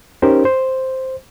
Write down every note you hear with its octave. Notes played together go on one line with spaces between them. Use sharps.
C#4 D#4 G4 A#4 C5
C5